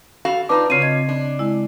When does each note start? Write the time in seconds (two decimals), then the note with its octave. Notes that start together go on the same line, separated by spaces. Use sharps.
0.25 F#4 A4 F5
0.49 D4 D#4 F4 B4 A5 D6
0.70 C#3 C4 F4 C#5 C7 D#7
0.82 D#5 G#6
1.09 D4
1.39 G#3 E4